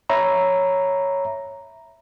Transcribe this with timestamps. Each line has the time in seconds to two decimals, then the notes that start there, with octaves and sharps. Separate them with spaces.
0.09 C#5 E5 A#5 B5